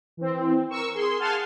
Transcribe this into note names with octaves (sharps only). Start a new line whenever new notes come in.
E3 C4
A#4 C#6 E6
G#4 C6
F5 F#5 G#5 A5 C6 F6